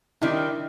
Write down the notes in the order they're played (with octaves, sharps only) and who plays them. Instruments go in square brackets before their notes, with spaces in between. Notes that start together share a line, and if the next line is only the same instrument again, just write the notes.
[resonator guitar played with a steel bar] C3 D#3 G3 [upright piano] D4 E4